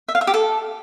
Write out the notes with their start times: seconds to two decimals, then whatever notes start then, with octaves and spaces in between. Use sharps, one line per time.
0.08 E5
0.15 F5
0.21 E5
0.27 G4
0.34 A4